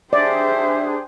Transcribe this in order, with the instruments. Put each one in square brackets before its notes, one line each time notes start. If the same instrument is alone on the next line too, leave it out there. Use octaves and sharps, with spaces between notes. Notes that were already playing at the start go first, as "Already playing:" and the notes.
[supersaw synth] D4 G#4 [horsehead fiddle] G4 C5 [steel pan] D5 [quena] E5